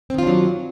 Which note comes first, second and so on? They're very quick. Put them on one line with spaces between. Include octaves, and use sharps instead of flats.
C4 D#3 F4 D4 F#3